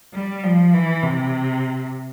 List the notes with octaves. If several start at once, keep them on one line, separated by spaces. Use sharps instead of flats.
G3
F3
E3
C3